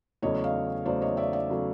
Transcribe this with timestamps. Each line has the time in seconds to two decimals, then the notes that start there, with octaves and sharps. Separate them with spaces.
0.22 E2 C#3 F#3 A3 C#5 D#5
0.44 D#5 F5
0.86 E2 C#3 F#3 A3 C5 D5
1.01 C#5 D#5
1.17 D5 E5
1.33 D5 E5
1.50 C#3 F#3 A3